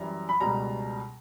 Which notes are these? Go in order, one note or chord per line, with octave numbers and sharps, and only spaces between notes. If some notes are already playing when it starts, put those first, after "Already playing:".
Already playing: F#2 E3 G3 A#5
B5
C#2 B2 G3 A#5